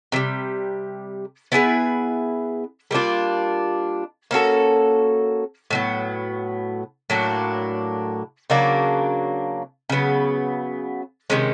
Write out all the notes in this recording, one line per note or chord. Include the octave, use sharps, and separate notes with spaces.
C3 E3 G3
B3 E4 G#4 B4
G3 A#3 D4 F4
A#3 C#4 F#4 A4
A2 F#3 B3
A2 F#3 A#3 D4
C#3 F#3 A#3 D4
C#3 F#3 B3
C3 D#3 G#3 C#4